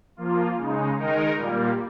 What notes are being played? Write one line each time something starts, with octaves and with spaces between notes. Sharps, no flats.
F3 A#3 F4
C#3 G#3 D#4
D#3 G#3 D#4 A#4
A#2 G3 A#3